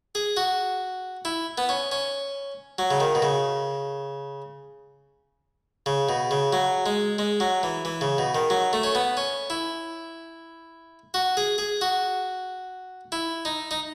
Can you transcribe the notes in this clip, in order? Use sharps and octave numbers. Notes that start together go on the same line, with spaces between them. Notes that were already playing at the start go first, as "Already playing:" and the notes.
G#4
F#4
E4
B3
C#4
C#4
F#3
C#3
D#3
B2
C#3
C#3
B2
C#3
F#3
G#3
G#3
F#3
E3
E3
C#3
B2
D#3
F#3
A3
C#4
B3
C#4
E4
F#4
G#4
G#4
F#4
E4
D#4
D#4